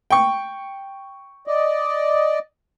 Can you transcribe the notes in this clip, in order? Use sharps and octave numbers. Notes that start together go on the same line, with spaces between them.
G5 C#6
D5 D#5